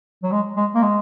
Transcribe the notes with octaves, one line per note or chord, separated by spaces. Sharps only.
F#3
G#3
G#3
A#3
G#3